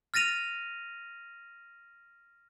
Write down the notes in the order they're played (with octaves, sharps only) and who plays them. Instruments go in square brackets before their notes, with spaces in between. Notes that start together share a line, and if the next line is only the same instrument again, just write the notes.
[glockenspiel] F6 A6 A#6 D#7 F7